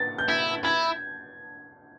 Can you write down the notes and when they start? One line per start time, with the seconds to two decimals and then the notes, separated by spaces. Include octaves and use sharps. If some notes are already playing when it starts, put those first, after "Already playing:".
Already playing: A6
0.18 G6
0.28 E4 G#6
0.64 E4 G#6